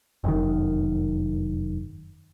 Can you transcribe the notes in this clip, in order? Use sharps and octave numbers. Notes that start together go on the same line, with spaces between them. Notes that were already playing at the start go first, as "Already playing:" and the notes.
F1 F#2 D#3